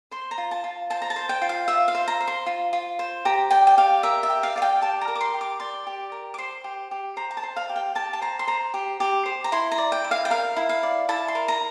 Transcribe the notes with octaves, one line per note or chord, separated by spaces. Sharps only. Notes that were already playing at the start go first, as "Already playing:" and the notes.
C5 C6
A#5
F4
A5
F4
C5 A5
A#5
A5
C5
G5
F4
F5
F4 E5
F5
C5
A#5
C5
C6
F4
F4
C5
G4 A#5
D5 G5
G5
G4 F5
A#4 E5
E5
G4
F5
D5 F5
G5
G4 A5
A#5
A#4
D6
C6
G4
D6
D5 C6
G4
A#4
D6
C5 C6
G4
G4
C5 A#5
A#5
A5
C5
F5
G4
G5
G4 A5
A5
C5 A#5
C6
C5 A#5
G4
G4
C5
A#5
E4 C6
A#5
D5
G5
E4
F5
G5
A#4 F5
E4
F5
D5
E4 A5
C6
A#4
A#5